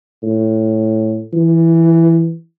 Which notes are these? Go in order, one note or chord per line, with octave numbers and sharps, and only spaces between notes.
A2
E3